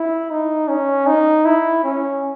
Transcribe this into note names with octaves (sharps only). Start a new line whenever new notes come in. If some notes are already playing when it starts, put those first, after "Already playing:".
Already playing: E4
D#4
C#4
D#4
E4
C#4